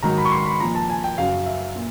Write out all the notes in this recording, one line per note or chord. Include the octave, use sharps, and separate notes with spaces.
G#2 D#3 F#3 A#5
B5
C#6
C6
B5
A#2 F3 A#5
A5
G#5
G5
F#2 C#3 F#3 F5
E5
A#2